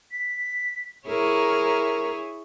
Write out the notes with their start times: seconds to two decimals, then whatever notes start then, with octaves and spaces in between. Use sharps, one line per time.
0.11 B6
1.06 E4 G#4 A#4 C#5